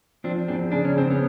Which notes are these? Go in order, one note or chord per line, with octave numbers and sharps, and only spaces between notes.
F3 C4 D4
E2 C4 D4
C#3 D4
C#4
C#3 C4
B3 C#4